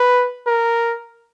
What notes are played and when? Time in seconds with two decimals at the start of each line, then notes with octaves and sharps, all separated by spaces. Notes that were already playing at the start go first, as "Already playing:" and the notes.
Already playing: B4
0.47 A#4